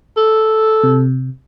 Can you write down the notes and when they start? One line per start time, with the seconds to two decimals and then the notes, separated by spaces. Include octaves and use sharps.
0.17 A4
0.83 C3